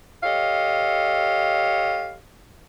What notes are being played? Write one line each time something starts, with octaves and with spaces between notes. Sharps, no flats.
G4 A4 C#5 D#5 F5